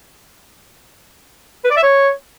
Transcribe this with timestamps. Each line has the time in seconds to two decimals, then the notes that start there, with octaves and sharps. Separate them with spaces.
1.64 B4
1.70 D5
1.77 E5
1.83 C#5